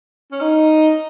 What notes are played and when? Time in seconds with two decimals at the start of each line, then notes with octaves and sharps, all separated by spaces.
0.32 C#4
0.41 D#4